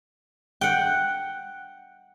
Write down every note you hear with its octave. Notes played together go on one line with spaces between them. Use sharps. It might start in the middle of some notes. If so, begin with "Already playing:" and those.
F#5 G5